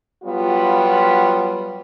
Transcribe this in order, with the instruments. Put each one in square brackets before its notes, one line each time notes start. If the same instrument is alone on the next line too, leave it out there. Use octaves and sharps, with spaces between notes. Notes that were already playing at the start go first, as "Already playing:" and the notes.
[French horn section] F#3 G3 B3 F4